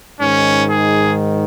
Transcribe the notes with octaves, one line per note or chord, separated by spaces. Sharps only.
G#2 D#3 C#4
G#4